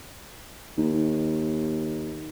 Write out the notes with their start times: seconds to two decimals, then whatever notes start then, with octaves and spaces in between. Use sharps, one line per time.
0.78 D#2